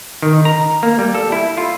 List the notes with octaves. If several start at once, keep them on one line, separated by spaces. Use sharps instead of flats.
D#3
A#5
A#3
G3
A4
E4
F4